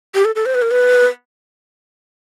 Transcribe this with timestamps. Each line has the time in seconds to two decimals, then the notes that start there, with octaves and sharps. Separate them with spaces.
0.15 G4
0.25 A4
0.35 A4
0.46 C5
0.55 B4
0.62 A#4
0.71 B4